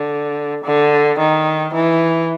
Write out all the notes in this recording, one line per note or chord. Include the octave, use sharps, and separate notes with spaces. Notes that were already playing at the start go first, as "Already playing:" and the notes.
Already playing: D3
D3
D#3
E3